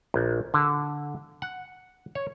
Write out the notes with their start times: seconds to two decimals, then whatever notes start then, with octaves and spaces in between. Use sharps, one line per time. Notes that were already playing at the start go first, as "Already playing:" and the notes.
0.14 A#1
0.54 D3
1.42 F#5
2.15 C#5